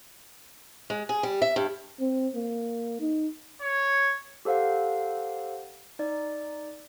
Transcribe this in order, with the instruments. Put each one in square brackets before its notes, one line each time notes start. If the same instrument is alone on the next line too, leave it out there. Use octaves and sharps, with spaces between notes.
[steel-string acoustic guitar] G#3
G#4
G3
E5
G2
[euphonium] C4
A#3
D#4
[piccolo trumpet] C#5
[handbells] G4 A4 C5 F5 F#5
D#4 D5